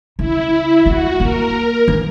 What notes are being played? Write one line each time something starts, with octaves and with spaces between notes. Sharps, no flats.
C#3 E4
B3 F#4
A#3 A#4
E3